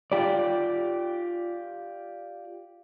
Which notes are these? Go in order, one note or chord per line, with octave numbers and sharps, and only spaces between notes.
F4 G4 D5